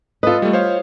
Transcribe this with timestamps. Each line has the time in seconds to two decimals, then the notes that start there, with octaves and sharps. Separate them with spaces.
0.23 F4 A4 B4 D#5
0.42 G3 A3
0.53 C5 C#5 F5